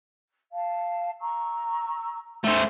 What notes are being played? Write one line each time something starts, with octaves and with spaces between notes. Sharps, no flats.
F5 A5
A#5 C#6 E6
A3 C#4 C5 G#5 C#6